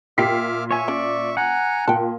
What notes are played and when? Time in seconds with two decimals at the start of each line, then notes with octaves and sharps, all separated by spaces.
0.18 A#2 G4 E5 G5 D6 F6 B6 C7
0.71 C#5 E5 G#5 C#6
0.88 C#4 D5
1.37 F#5 G#5 A#5
1.88 A#2 G5 A5